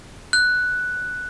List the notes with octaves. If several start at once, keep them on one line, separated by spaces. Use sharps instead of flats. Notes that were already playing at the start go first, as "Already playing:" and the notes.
F#6